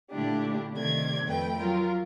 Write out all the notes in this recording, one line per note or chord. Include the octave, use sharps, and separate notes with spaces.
A#2 D3 A3 D4 E4 G4
C3 D#3 A3 D5 G#6
F2 A3 B4 G5
F#3 F4 A#4